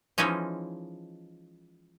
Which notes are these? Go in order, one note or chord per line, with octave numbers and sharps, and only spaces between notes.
E3 F3 G#3 C#4 D#4